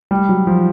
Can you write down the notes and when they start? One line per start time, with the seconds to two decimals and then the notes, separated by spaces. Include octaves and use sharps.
0.11 G3
0.29 F#3
0.47 F3